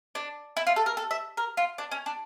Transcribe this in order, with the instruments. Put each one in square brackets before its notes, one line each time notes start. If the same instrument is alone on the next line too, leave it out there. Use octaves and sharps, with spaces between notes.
[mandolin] D4
E4
F4
A4
A#4
A4
E5
A#4
F4
D4
C#4
D4